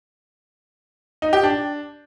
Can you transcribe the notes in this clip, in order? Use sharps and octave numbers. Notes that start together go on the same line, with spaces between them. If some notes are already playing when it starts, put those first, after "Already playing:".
D#4
G4
D4